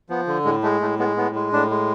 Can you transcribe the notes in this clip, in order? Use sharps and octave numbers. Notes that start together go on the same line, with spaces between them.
F3 B3
D3
A2 G#3
G#3 A3
A2 A3
G#3 B3
A2 B3
G#3
A2 D4
G#3